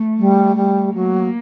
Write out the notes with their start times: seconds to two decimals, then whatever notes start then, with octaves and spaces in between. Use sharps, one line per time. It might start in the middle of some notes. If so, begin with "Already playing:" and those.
Already playing: A3
0.18 G3
0.56 G3
0.94 F#3 A#3